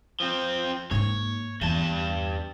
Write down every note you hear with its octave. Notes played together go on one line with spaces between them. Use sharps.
F3 C4
G#2 A#3 C#5
E2 G2 A5